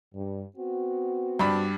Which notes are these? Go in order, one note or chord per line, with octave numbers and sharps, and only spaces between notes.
G2
B3 C4 F#4
G2 D4 B5